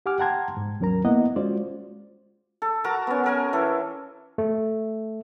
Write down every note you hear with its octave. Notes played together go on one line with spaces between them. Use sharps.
G4 F#5 G#5 D6 F6
F#5 G5 A5 A#5 C6 G#6
G#2
D#2 F#3 C#4 A#4 A#5
A#3 B3 E4 D#5 F#5
G#3 C#4 F4 F#4 C5 D5
A4
F#4 A#4 A5 A#5
B3 C#4
A4 A#4 G#5
E3 A4
A3